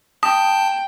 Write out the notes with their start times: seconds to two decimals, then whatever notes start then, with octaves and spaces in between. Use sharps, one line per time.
0.23 G5 A5 D#6